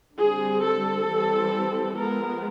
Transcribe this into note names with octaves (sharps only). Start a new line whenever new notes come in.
D3 G3 C4 G#4
A4
E3 G3 C4
F3 G#3 B3 A#4